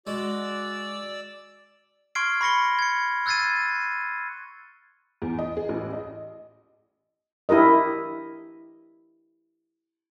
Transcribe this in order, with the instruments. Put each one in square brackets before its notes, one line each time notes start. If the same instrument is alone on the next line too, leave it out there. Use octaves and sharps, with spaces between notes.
[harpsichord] G#3 [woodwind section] F#4 [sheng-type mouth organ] D5 E6
[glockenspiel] C6 C#6 F6 G#6 C7 D7
B5 C#6 A#6 C#7 G7
G#6 C#7
E6 F#6 G#6 A6 C7 D#7
[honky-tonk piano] E2
D#5
G#4
A1
D#5
[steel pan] D4 E4 G4 A#4 D#5